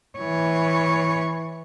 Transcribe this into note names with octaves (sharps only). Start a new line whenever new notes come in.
E3 C#5